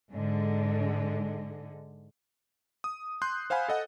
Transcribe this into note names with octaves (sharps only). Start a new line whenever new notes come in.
G#2 D3 G#3
D#6
C6 F#6 G6
C5 F5 F#5 G#5 B5
A4 D#5 F#5